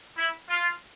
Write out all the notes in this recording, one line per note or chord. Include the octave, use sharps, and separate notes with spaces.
E4
F4